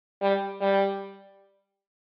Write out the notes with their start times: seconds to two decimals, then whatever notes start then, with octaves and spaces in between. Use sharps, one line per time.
0.21 G3
0.61 G3